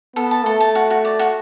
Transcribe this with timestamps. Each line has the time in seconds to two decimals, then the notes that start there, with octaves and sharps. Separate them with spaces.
0.16 B3 A4
0.31 A5
0.45 A3 A4
0.61 A5
0.75 F#4
0.90 F#4
1.05 D5
1.19 F#4